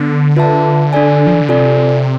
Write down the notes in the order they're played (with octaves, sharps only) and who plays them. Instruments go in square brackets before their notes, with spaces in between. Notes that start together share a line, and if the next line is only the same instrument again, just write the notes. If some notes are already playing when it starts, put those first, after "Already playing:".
Already playing: [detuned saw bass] D3 [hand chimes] B3
[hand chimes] F4 B4 E5 A5
D4 A4 D5 G#5
[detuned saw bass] F3
E3
D3
[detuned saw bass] C3 [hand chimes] F4 A4 D5 G#5